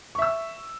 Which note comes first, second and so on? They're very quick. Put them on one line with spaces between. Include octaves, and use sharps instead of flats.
C#6 E5 E6